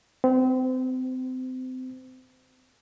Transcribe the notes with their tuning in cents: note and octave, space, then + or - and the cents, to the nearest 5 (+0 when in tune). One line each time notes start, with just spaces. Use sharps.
C4 -30